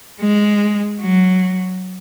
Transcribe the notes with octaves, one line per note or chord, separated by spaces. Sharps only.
G#3
F#3